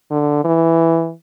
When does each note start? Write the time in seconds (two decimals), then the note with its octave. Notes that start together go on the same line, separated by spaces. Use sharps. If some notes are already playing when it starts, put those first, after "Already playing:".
0.11 D3
0.44 E3